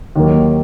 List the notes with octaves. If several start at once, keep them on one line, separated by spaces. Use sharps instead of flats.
D#2 D#3 F#3 A#3